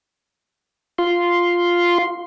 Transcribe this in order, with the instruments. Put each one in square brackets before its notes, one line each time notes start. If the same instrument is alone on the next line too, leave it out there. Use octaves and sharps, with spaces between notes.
[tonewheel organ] F4 C6